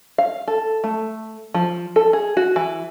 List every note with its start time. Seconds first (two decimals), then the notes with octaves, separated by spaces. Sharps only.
0.18 F5
0.48 A4
0.84 A3
1.54 F3
1.96 A4
2.13 G#4
2.37 F#4
2.56 E3